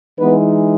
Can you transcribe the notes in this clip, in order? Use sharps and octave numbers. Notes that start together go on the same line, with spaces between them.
E3 G#3 B3 D#4 B4